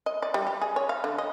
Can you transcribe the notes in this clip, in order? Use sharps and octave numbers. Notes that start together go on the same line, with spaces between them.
D#5
D5
G3
G4
G#4
C#5
F5
D3
D#5